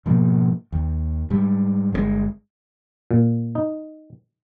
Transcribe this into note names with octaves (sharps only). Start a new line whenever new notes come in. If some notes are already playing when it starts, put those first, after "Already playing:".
G#2 B2 F3 A#3
D#2
G#2 G3
G1 C3 G#3
A#2
D#4